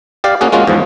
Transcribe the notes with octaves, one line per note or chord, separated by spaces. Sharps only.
G4 D5 F5
A#3 C#4 F#4 G#4
G#3 A#3 C#4 F4 F#4
E2 G#2 F3